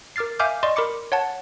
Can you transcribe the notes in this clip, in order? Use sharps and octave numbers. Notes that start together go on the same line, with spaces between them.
A#4 D6 F6 A6 C7
E5 F5 G#5 D6 F6 G6
D5 D#5 C6 C#6
A#4 B5 C6 D6 C#7
C#5 F#5 A5